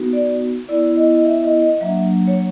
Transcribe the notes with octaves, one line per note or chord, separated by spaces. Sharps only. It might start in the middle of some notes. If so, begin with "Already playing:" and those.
Already playing: B3 D#4 F#4
D5
B3 E4 D5
D#5
D#5
E5
D#5
D#5
F#3 A#3 D4 E5
C#5